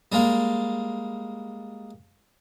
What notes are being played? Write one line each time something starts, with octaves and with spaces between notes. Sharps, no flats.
G3 G#3 A#3